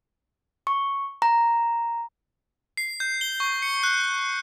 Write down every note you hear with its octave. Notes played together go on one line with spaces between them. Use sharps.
C#6
A#5
C7
G6
G7
C#6
C#7
F#6